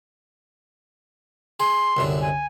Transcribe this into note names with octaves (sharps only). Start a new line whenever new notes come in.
G#4 C6
C2 F#2 D3
G#5